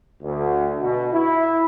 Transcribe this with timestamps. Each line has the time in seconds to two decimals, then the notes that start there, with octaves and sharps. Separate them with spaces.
0.23 D2
0.80 B2
1.13 E4